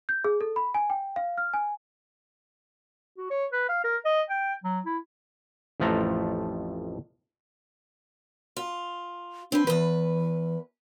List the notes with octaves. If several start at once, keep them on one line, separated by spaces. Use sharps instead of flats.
G6
G#4
A4
B5
G#5
G5
F5
F6
G#5
F#4
C#5
B4
F5
A#4
D#5
G5
F#3
E4
A1 F2 F3 A3 A#5
F4
C4 D4 B4
E2 E3 B4